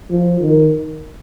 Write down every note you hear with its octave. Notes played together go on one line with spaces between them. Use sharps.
F3
D#3